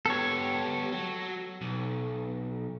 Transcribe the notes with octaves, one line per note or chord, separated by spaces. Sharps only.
B3 G4 A4 C#5
F#3
B1